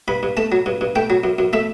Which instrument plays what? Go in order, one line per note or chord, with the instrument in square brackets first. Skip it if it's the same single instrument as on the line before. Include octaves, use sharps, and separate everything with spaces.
[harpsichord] G2 B5
G2
A3 A5
F#3
G2
G2
A3 G5
F#3
F#2
F#2
A3 E5